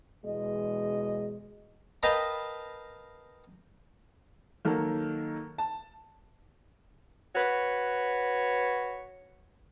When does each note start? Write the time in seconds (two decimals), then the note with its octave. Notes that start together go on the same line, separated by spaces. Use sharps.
0.24 E2 B2 G#3 G#4 D#5
2.03 A#4 B4 D#5 F5 G5 A5
4.65 D#3 F#3 A#3 A4 A#4
5.58 A5
7.35 F#4 B4 C#5